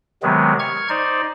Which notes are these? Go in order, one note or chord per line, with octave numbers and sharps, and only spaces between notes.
C3 D#3 F#3 G#3 B3
C#6 F6 G#6
D#4 C5 D5